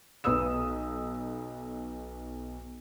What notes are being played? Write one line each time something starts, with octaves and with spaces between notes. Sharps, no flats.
B1 B4 D#6 E6 E7